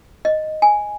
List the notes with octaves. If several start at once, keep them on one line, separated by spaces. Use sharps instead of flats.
D#5
G#5